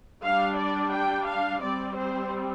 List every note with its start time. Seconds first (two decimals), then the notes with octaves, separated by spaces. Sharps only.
0.24 G3 D4 F5
0.58 D5
0.94 G5
1.28 F5
1.62 G3 C4 D5
1.96 C5